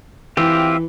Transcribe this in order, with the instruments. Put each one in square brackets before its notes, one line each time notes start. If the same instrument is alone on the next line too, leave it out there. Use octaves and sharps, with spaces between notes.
[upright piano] E3 [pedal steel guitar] C4 F4 G4 [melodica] E5